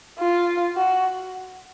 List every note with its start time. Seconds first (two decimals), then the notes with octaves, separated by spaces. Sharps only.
0.19 F4
0.77 F#4